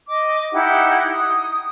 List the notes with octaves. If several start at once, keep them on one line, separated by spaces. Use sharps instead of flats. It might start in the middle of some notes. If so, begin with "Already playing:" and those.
D#5 D6
D#4 E4 G4 F#5
D#6